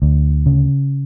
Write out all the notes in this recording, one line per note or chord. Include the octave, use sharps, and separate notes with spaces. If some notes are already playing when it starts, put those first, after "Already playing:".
D2
C#3